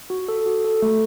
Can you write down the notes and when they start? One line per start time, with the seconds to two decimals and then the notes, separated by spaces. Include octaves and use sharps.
0.10 F#4
0.28 A4
0.46 F#4
0.65 A4
0.82 A3